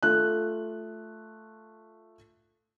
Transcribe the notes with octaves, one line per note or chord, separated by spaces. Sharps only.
A3 F4 F#6